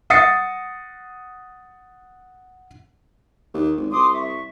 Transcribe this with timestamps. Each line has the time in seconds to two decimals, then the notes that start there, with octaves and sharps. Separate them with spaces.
0.10 F#5 D#6 A6 A#6 C7 C#7
3.54 D#2
3.76 G#1
3.91 C2 C6 D6 D#6
4.13 E5 C#6